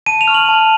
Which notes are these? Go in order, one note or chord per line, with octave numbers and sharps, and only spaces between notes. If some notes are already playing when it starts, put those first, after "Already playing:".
A5 D#7
F7
C#6 F6
F#7
A5